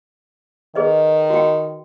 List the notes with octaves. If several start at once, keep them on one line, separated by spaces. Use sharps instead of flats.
D#3 G#4 B4 D#5
F#4 G5